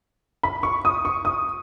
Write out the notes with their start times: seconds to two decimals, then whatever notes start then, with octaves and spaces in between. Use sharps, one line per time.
0.43 B5
0.63 C#6
0.85 D#6
1.05 C#6
1.25 D#6